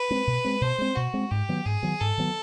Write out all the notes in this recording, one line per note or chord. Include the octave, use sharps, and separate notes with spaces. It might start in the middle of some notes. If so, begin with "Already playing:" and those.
Already playing: B4
G#3 C4
B2
G#3 C4
B2 C5
G#3 C4
B2 F#4
G#3 C4
G#2 G4
D#3 F#3 B3
G#2 G#4
D#3 F#3 B3
G#2 A4
D#3 F#3 B3